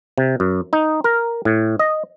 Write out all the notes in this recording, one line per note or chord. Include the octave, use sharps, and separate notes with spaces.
C3
F#2
D#4
A#4
A2
D#5